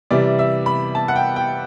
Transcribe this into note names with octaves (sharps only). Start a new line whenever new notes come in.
C3 E3 G3 D5
E5
B5
A5
F#5
G5
G5